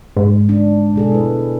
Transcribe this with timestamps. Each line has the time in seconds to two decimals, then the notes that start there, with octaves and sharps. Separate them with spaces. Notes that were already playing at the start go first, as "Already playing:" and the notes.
0.17 G#2
0.49 D4
0.96 B2 G#4 A4
1.12 E4 B4